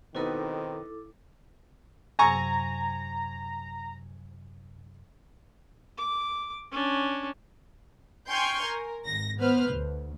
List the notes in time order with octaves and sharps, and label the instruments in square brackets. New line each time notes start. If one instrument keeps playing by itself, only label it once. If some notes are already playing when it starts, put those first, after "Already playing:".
[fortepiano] B2 B3 D#4 [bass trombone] D#3 [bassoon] C4 [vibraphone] E4 A4 D6
[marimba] F#2 C3 F#3 [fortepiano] G#5 C#6 [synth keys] A#5
[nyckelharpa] D6
C#4 D4
[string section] G5 G#5 C6 C#6 F6 G6
A#4
G#1 A#6
B3 B4 C5 F6
D2